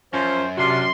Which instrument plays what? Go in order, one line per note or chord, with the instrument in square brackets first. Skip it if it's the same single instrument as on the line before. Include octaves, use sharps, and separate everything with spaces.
[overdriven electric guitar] F#2 [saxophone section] F3 C#4 [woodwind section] C5
[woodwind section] C3 F4 [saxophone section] C#4 D4 F#4 [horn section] C6